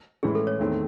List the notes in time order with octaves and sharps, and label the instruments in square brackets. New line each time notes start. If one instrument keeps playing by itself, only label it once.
[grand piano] A2 E3 G#3 C#4 E4 [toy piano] G#4
[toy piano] A4
C#5
[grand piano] E2 D#3 A3 C4